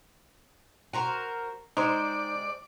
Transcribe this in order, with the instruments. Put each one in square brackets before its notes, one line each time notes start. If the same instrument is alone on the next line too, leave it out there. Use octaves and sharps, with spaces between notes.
[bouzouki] F#4 A#4 C5
[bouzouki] G#3 C5 [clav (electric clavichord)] D#4 [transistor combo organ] D5